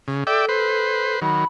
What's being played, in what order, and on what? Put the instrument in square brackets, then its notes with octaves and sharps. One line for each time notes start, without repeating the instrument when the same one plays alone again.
[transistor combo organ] C#3
[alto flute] A4 [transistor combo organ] D5 E5 G5
[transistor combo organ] B4 C5
[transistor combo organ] D#3 F#3 [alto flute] B5